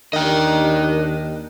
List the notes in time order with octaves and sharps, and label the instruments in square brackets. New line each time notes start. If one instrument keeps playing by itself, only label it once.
[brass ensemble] D#2 [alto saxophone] D#3 [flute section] D4 G4 F#6 [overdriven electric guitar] D#5 G5